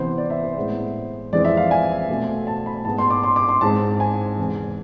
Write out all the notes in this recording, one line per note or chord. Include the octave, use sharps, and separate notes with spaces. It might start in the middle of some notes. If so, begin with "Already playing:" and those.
Already playing: C3 E3 B3 C5
D5
E5
C5
A2 G#3 B3
F2 E3 G#3 C4 D5
E5
F5
G#5
B2 A3 C4
A5
B5
G#2 G#3 B3 A5
C6
D6
C6
D6
C6
G#2 G#3 C4 A5
G#5
E2 C3 G#3